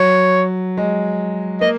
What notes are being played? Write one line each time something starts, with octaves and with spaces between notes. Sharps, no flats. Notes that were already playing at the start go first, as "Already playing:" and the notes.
Already playing: F#3 C#5
G#3
A#3 D#5